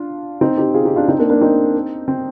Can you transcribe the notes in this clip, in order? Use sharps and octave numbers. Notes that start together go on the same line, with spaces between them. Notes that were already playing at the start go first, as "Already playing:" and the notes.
Already playing: D4 F4
C4 D#4
D#4 G4
F4 G#4
D#4 G4
D4 F4
C4 D#4
A#3 D4
A#3 D4
C4 D#4
C4